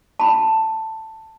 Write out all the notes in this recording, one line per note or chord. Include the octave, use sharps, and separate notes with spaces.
A5 B5